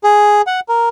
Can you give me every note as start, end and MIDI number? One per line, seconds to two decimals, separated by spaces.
0.04 0.42 68
0.47 0.60 78
0.69 0.89 70